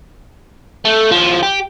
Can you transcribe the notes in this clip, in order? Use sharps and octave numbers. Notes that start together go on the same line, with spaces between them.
A3
D#2 F3
G4